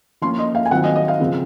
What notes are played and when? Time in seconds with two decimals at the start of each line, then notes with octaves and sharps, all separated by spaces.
0.21 F3 A#3 C#4 F4 C6
0.39 D#5
0.55 F5
0.66 G#5
0.71 D#3 F#3 C4 F4 F#5
0.84 D#5
0.96 D#5
1.08 F5
1.20 C#3 F3 C4